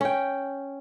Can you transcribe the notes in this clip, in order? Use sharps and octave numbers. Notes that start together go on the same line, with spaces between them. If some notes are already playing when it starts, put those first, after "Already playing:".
C#4 G5